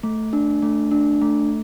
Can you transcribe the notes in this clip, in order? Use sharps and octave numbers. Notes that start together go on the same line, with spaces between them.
A3
D4
A3
D4
A3